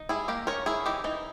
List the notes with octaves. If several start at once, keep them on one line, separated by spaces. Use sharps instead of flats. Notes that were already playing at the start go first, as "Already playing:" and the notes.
Already playing: D#4
G3 E4 G#4
A#3 G4 A#4
C#4 A#4 C#5
C#4 E4 G#4
E3 D#4 G4
E3 D#4